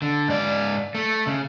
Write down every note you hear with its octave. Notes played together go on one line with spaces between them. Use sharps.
D3
G#2 D5
A3
C#3